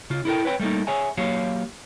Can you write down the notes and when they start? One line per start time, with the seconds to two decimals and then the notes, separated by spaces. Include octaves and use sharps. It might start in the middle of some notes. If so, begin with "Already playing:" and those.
0.10 C#3 F4
0.25 E4 G4 A4 A#4 G5
0.45 B4 C#5 G5
0.60 G3 A3 A#3 D#4
0.87 G#4 C#5 E5 G#5
1.17 F#3 A#3 G4 C#5 F5